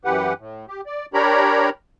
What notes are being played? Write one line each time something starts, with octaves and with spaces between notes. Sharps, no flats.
F#2 E3 G4 B4 F#5
A2
G4
D5
D4 G4 A#4 C#5 A#5 B5